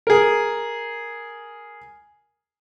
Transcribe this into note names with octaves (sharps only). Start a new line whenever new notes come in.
G#4 A#4